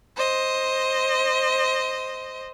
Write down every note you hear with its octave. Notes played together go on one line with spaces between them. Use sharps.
C5 D#5